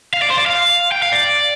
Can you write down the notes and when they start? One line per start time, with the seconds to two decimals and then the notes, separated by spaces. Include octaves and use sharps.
0.14 F5
0.22 D5
0.30 C5
0.38 D5
0.46 F5
0.92 G5
1.02 F5
1.12 D5